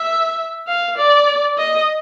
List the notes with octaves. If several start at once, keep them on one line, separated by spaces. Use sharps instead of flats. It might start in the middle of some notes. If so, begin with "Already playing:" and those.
Already playing: E5
F5
D5
D#5